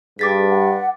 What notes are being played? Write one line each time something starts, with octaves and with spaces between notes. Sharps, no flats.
G2 G#4 D6 A6 B6
F#5